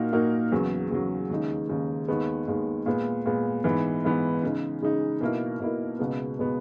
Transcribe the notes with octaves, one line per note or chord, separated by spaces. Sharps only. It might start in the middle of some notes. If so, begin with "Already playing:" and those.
Already playing: A#2 A#3 D#4 F#4 A#4
A#2 A#3 D#4 F#4 A#4
E2 C#3 F#3
E2 C#3 F#3
D#2 C#3 G#3 D#4
D#2 C#3 G#3 D#4
D#2 D#3 G#3 B3
D#2 D#3 G#3 B3
A#2 G#3 B3
A#2 G#3 B3
G#2 E3 B3
G#2 E3 B3
C#3 G#3 D#4
C#3 G#3 D#4
B2 A#3 E4 A#4
B2 A#3 E4 A#4
C#2 B2 G#3 B3
B2 G#3 B3